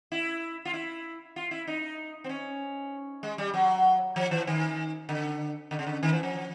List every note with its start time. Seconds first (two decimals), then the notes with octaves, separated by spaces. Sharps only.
0.12 E4
0.65 F4
0.74 E4
1.36 F4
1.51 E4
1.67 D#4
2.24 C4
2.29 C#4
3.23 G#3
3.38 G3
3.54 F#3
4.16 F3
4.31 E3
4.47 D#3
5.09 D3
5.71 D3
5.79 C#3
5.87 D3
6.03 D#3
6.13 E3
6.23 F3